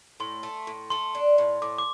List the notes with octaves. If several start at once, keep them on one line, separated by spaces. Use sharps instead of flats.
A2 C6
A3
A2
A3 C6
D4
A2
A2 D6
D6